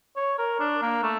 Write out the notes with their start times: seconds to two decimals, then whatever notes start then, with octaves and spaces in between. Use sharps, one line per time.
0.16 C#5
0.38 A#4
0.59 D4
0.82 A#3
1.03 A3